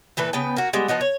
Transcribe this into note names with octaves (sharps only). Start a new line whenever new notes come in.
A#2 E3 A3 B4
C#3 B3 B4 G5
A#3 F#4
G3 G#3 B3
F3 B3 D#4 F#4
C#5